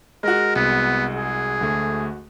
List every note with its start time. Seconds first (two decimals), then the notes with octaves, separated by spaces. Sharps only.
0.23 G#3 F#4 A#4
0.56 C2 B3
1.15 G#4
1.61 D2 A3